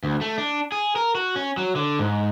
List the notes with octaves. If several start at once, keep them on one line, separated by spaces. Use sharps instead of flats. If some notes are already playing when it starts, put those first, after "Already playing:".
D2
A3
D4
G#4
A#4
F#4
C#4
F#3
D3
G#2